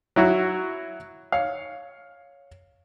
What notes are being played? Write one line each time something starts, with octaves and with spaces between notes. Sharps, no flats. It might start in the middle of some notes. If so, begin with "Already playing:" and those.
F#3 E4 F#4
C#5 F5